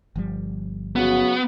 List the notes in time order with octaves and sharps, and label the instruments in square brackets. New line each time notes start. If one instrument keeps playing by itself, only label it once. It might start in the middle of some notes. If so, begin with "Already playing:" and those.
[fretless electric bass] G1 F3 G3
[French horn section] C#3 F#3 F#4 [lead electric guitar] B3